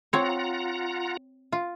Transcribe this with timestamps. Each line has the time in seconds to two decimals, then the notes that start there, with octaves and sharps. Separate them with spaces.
0.13 C4 F4 C#5 F#5 A#5
1.52 F4